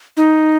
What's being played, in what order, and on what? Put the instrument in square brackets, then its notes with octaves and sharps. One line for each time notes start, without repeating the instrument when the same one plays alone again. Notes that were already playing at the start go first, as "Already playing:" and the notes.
[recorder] D#4